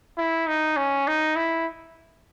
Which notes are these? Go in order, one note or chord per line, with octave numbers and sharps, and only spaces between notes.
E4
D#4
C#4
D#4
E4